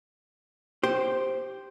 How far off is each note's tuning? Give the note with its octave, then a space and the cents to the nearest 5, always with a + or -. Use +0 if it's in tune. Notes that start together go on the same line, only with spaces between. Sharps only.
G4 +0 C5 +0